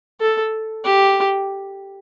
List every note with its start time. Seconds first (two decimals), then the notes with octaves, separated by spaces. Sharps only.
0.21 A4
0.85 G4